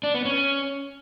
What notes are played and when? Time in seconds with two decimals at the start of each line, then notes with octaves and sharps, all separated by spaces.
0.03 D4
0.14 B3
0.25 C#4